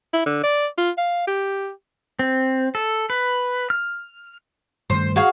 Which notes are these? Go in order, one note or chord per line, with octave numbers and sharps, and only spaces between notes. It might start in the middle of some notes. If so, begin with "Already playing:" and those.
E4
D3
D5
F4
F5
G4
C4
A4
B4
F6
G2 D#3 A3 C5
F#4 G#4 F5